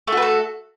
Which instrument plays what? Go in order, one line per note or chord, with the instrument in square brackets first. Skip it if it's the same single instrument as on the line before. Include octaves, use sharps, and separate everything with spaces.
[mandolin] A3
F#4
B4
A4